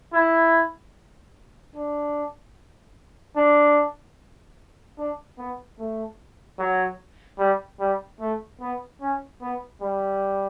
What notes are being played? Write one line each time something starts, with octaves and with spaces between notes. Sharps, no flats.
E4
D4
D4
D4
B3
A3
F#3
G3
G3
A3
B3
C#4
B3
G3